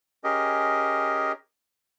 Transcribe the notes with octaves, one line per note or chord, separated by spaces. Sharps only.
C#4 G4 G#4 A#4 D#5